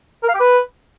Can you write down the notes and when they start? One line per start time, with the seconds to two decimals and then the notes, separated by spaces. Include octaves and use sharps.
0.23 A#4
0.29 F5
0.34 G4
0.40 B4